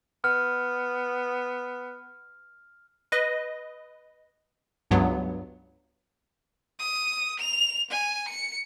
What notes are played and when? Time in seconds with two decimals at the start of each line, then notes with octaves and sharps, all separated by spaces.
0.24 B3 F6
3.12 B4 D#5
4.91 C#2 G2 F#3 B3
6.79 D#6
7.40 F7
7.91 G#5
8.28 C#7